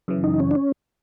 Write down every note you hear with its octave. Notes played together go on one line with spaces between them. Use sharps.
F#2 C#3 E3
D#4
C#4
D4
C#4